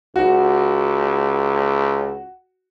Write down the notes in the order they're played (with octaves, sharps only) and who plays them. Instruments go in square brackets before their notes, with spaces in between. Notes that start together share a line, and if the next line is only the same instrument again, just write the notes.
[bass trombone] C#2 [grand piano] F#4